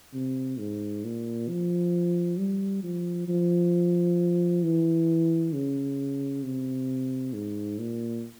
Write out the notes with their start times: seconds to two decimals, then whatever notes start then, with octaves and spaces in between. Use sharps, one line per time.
0.14 C3
0.58 G#2
1.04 A#2
1.49 F3
2.39 G3
2.83 F3
3.28 F3
4.64 E3
5.53 C#3
6.43 C3
7.33 G#2
7.79 A#2